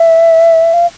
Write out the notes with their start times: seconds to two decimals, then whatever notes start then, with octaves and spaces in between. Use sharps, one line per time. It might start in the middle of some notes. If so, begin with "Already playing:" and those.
Already playing: E5
0.74 F5